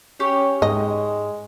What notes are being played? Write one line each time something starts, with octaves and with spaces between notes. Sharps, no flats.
C#4 G4 C#5
G#2 G#3 D#5